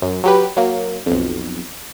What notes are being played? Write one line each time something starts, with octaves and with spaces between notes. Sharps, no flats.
F#2
F#3 G4 B4
F#3 A#3
B1 F2